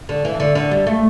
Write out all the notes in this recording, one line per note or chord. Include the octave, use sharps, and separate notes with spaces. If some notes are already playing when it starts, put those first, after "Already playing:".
D3
E3
D3
D3
G3
A3